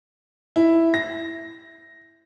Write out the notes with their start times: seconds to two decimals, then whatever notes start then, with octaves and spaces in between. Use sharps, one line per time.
0.56 E4
0.94 A#6